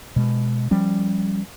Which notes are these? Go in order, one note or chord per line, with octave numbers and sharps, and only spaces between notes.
B2 G#3
F3 G3 C#4